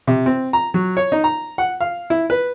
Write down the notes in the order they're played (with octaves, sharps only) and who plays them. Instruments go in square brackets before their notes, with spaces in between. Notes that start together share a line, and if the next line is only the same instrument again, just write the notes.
[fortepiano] C3
C4
A#5
F#3
C#5
D#4
A#5
F#5
F5
E4
B4